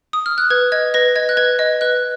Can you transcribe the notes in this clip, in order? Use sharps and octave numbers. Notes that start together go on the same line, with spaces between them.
D#6
F6
F#6
B4 G#6
D#5 G#6
B4 A#6
D#5 G#6
F#6
B4 G#6
D#5
B4 F#6